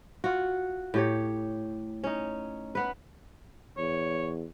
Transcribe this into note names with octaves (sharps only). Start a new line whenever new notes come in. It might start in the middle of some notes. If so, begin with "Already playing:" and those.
F4 F#4
A2 G4 C#5
C#4 D#4
B3 B4
E2 C#5